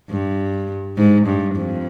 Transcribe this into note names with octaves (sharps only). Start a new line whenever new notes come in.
G2
G#2
G2
F2